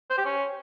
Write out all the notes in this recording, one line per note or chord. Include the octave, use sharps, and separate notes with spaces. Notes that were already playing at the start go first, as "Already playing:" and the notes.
C5
G4
C#4